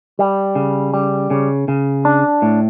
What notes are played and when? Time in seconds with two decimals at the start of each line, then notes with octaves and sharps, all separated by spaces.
0.19 G3
0.55 C#3
0.94 G3
1.31 C#3
1.68 C#3
2.05 D4
2.42 A2